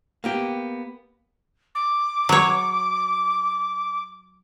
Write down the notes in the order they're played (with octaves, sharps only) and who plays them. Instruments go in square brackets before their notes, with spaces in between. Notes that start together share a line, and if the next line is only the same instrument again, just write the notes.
[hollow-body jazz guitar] A#3 B3 G4
[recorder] D6
[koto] F#3 C#5